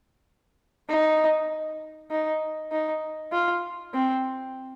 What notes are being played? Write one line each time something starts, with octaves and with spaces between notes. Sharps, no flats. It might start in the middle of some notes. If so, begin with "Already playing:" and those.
D#4
D#4
D#4
F4
C4